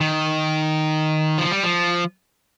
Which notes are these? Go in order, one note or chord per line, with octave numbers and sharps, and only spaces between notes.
D#3
F3
G3
F3